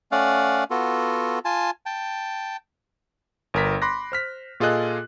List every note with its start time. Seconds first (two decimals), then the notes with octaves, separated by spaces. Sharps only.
0.12 A3 C#4 D5 F5 F#5
0.71 B3 F4 F#4 A4
1.45 F4 G#5 A5
1.86 G5 A5
3.54 G1 A#4 B6
3.82 B5 C6 D6 F#6 A#6
4.12 C5 F6 B6
4.60 A#2 F4 G#4 A4 D#5 F#6